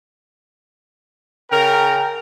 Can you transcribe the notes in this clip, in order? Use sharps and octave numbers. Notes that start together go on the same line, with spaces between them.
C#3 A#4 G5